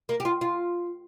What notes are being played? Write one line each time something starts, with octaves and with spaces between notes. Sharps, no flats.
A#3
G4
F4
F4